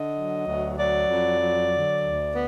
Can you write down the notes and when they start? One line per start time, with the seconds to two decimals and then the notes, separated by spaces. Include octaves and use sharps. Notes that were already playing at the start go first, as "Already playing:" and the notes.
Already playing: D3 D#5
0.15 F#3
0.46 D2
0.77 F#3 D5
1.08 F2
1.39 F#3
1.71 D3
2.01 D2
2.33 B3